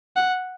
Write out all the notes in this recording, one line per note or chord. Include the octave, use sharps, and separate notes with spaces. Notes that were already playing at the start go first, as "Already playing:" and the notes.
F#5